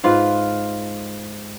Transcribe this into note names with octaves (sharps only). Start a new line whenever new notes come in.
G#2 F4 B4 F5